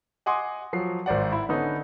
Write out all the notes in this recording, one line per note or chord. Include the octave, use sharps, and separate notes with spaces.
D#5 F#5 G#5 C6 D6 D#6
F3 F#3 C7
G#1 C5 D5 F#5
E4
D3 B3 C#4 D#4